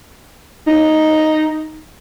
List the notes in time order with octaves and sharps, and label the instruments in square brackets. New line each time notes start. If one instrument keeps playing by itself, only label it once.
[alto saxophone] D#4